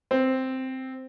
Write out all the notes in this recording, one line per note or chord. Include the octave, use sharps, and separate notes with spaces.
C4